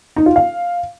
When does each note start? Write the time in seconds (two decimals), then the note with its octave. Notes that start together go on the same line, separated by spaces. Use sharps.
0.16 D#4
0.26 F4
0.36 F5